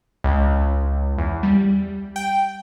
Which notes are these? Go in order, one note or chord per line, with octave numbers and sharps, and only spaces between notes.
C#2
E2
G3
G5